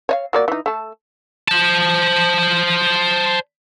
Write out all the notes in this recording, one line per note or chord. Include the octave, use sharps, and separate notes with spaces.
C#5 D#5 F5
F#3 A#3 D5
E3 D#4
A3 A4
C5 A5